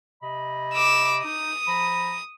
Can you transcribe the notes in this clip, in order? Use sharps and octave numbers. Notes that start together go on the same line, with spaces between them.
C3 D#5 B5
D6 E6
D#4 D#6
F3 A#5 B5